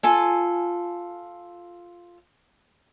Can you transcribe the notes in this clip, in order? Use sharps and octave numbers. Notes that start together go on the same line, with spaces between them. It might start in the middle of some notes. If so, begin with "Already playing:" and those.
F4 A4 G#5